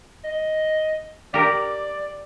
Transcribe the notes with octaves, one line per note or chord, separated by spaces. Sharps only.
D#5
G4 A#4 D5